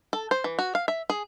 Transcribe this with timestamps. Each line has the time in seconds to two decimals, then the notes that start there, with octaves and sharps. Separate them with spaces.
0.13 A4
0.31 C5
0.44 E3
0.59 F#4
0.75 F5
0.88 E5
1.10 G#4